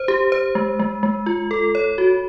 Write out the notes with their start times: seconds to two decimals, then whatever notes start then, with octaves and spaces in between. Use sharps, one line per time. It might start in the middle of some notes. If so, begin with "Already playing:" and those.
Already playing: C5
0.08 G4
0.32 C5
0.55 G#3
0.79 G#3
1.03 G#3
1.26 F4
1.51 A4
1.75 C#5
1.98 F#4